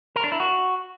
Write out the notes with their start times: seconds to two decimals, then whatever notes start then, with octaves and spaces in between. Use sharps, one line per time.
0.16 A#4
0.24 D4
0.32 E4
0.40 F#4